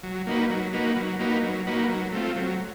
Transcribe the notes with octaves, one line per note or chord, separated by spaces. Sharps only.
F#3
A#3 D#4 F#4 B4
F#3
A#3 D#4 F#4 B4
F#3
A#3 D#4 F#4 B4
F#3
A#3 D#4 F#4 B4
F#3
A3 C4 F4
F#3